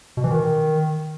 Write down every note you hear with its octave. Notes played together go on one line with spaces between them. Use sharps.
B2
E3
D#3